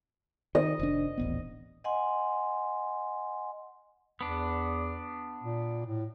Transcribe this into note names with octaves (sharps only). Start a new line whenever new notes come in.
D#3 D#5
F1 D4
D#1 A1 B3
D#5 F#5 G#5 C6
E2 B3 D4
A#2
A2